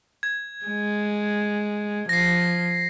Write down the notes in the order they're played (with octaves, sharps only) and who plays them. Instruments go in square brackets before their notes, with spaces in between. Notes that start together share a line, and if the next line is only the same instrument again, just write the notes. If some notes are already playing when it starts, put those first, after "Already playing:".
[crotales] G#6
[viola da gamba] G#3
[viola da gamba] F3 [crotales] A#6 C7